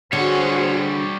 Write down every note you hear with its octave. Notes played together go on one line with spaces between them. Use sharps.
D3 G3 F#4 G#4 C5 C#5